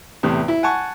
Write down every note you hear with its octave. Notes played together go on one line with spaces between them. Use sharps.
E2 A2 C3
E4
F#5 G#5 A5 C#6